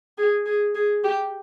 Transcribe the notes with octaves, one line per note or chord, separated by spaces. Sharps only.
G#4
G#4
G#4
G4